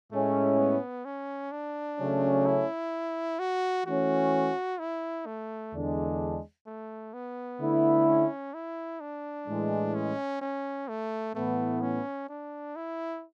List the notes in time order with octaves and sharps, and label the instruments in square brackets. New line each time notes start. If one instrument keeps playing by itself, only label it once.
[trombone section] A2 G#3 C#4 E4 [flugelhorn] A3
[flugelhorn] B3
C#4
D4
[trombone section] C#3 F#3 A3 C#4
[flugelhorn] E4
F#4
[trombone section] E3 A3 C#4 [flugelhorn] F#4
[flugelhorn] E4
A3
[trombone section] E2 D3 G#3 D4
[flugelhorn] A3
B3
[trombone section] D3 A3 E4
[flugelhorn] C#4
E4
D4
[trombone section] A2 E3 G#3
[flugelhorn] C#4
C#4
A3
[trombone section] A2 E3 B3 [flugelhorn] A3
[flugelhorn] C#4
D4
E4